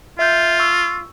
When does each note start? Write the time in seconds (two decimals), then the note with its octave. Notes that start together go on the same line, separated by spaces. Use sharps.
0.19 F4 E5 G6
0.59 C#6 E6